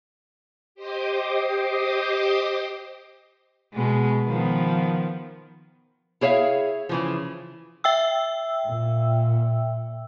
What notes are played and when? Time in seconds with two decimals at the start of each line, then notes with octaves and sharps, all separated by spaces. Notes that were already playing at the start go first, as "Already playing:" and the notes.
0.75 G4 C5 D#5 C6 D6 D#6
3.74 B2 G#3
4.26 D#3 F3 B3
6.21 E4 G#4 C#5 E5 F5
6.89 C#3 E3 F3
7.84 E5 G5 E6
8.66 A#2